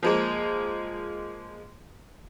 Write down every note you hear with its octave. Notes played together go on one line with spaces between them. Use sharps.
F3 G#3 A#3